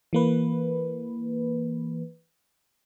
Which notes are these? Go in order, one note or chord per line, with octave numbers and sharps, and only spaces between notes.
E3 A#3 B4